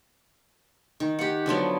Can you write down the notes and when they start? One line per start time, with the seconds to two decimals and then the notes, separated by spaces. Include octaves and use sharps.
1.00 D#3
1.19 G4 F#5
1.46 D3 F3 F#3 B3